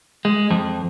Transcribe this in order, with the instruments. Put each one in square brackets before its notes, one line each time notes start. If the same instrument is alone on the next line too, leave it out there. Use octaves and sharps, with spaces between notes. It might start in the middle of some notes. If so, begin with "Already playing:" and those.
[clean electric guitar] G#3
F2